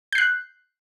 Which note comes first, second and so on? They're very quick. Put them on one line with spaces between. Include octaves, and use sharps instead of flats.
G6 C7 F#6